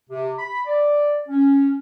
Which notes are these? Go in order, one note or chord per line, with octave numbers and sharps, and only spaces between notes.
C3
B5
D5
C#4